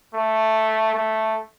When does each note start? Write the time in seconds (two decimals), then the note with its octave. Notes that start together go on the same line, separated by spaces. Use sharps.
0.14 A3
0.94 A3